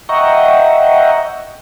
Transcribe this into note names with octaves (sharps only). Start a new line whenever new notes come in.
D#5 E5 F#5 G5 A#5 C#6